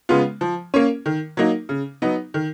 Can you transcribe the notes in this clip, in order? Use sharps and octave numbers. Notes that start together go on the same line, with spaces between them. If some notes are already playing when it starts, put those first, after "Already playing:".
C#3 G#3 B3 F4
F3
A#3 C#4
D#3
F#3 A#3 D#4
C#3
F#3 B3 D#4
D#3